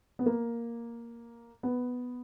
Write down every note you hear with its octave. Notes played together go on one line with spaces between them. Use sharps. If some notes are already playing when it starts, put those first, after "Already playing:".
B3
A#3
B3